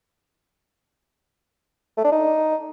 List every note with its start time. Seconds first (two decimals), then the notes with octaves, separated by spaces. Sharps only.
1.97 A3
2.05 D4
2.12 D#4